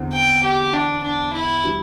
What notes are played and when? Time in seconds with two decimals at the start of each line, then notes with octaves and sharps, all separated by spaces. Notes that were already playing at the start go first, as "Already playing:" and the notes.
Already playing: E2 D3 C4
0.13 G5
0.44 G4
0.73 D4
1.03 D4
1.33 E4
1.63 E3 G3